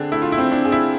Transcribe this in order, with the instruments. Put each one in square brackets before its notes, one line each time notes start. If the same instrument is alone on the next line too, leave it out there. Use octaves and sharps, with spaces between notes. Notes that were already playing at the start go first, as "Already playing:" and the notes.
Already playing: [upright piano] D3 C4 G#4 [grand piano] D4
[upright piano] A3 [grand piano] E4
[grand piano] F4
E4
[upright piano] C4
[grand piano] D4
[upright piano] G#4
[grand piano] E4